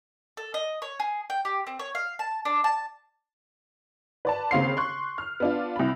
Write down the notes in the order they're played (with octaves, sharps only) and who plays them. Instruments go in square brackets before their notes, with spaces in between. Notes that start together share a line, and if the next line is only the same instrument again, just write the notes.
[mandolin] A4
D#5
C#5
G#4
G5
G4
C4
C#5
F5
A5
D4
A5
[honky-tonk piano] B4 D5 A5
D#2 C#3 C4 F5 C6 C7
C6 C#6 F#6
F6
B3 D4 F4
C2 B5